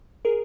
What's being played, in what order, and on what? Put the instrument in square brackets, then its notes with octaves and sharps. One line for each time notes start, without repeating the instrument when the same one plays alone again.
[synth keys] G#4 A#4